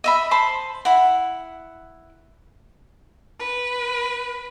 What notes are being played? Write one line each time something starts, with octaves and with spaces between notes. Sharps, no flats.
D#5 E5 B5
C5 A5 B5 C6
E4 F#5
B4